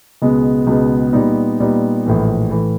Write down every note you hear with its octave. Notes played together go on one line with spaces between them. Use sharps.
C#2 B2 G#3 B3
C#2 B2 G#3 B3
A#2 G3 B3 D#4
A#2 G3 B3 D#4
A#1 A2 E3
A2 E3